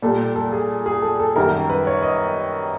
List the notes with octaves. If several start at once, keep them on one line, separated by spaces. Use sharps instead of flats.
A#2 G3 A4
A4
G#4
G#4
A4
A4
F#2 D#3 G3 A#4
B4
C#5
D#5